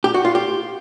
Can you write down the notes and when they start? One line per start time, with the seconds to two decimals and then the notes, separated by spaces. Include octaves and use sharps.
0.04 G4
0.14 F#4
0.25 F4
0.35 G4